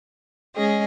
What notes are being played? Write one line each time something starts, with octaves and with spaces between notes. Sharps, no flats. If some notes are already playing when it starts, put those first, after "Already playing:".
G#3 C#4 G#4 D#5